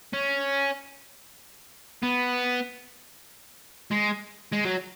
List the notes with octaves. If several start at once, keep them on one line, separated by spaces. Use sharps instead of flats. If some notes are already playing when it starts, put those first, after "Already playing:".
C#4
B3
G#3
G#3
F#3